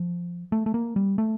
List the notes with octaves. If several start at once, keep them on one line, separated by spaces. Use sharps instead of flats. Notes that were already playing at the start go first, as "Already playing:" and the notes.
Already playing: F3
A3
A3
A#3
G3
A3